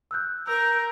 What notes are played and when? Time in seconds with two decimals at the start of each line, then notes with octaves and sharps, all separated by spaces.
0.11 E6 F#6 G6
0.47 A#4 E6 G6